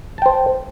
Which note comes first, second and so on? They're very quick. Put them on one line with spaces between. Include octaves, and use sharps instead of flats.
A5 G5 C5